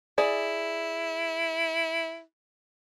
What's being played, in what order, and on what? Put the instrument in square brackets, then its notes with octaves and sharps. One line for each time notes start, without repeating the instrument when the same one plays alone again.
[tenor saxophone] E4 [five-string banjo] G#4 D5